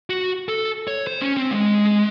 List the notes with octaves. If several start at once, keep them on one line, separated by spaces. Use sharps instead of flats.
F#4
A4
C#5
C5
C#4
C4
G#3